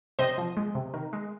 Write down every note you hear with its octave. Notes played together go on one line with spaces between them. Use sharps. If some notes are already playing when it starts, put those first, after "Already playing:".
C3 C5 D#5
F3
G#3
C3
D#3
G#3